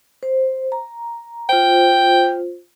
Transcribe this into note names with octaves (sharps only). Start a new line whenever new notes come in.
C5
A#5
F4 C5 G5